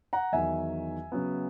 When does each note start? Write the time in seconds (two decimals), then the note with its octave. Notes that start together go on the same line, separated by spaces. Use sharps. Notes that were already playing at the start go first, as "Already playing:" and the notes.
0.13 F#5 A#5
0.32 E2 D#3 F#3 E5 G#5
1.12 C#3 F#3 B3